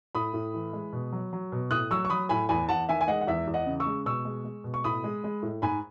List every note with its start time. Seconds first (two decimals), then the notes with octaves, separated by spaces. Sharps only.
0.15 A2 B5 D#6
0.34 A2
0.54 E3
0.73 G#3
0.93 B2
1.12 F#3
1.33 F#3
1.52 B2
1.71 A2 D#6 F#6
1.91 F#3 C#6 E6
2.05 C#6
2.10 F#3 B5 D#6
2.29 A2 G#5 B5
2.49 E2 G#5 B5
2.69 E2 F#5 A5
2.89 D#3 E5 G#5
3.01 G#5
3.08 G#3 D#5 F#5
3.21 F#5
3.27 E2 E5
3.47 E2
3.54 D#5 F#5
3.66 C#3
3.80 C#6 E6
3.86 G#3
4.05 B2 C#6 E6
4.25 G#3
4.45 G#3
4.64 B2
4.74 C#6
4.84 A2 B5 D#6
5.04 G#3
5.24 G#3
5.42 A2
5.62 G#2 G#5 B5